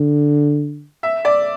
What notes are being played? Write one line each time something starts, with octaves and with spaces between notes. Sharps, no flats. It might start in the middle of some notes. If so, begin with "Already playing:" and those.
Already playing: D3
E5
D5